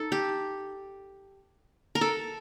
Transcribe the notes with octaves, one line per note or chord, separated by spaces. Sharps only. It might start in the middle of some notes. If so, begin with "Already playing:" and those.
Already playing: D#4 A4
G4
A#4
A4